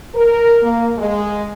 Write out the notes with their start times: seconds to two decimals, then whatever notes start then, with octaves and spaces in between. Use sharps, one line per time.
0.14 A#4
0.62 A#3
0.98 G#3